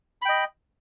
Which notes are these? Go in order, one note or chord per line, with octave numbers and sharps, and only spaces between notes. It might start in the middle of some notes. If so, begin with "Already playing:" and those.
D#5 G5 B5